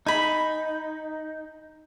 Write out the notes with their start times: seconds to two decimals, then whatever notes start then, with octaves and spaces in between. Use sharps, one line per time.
0.07 D#4 G#5 B5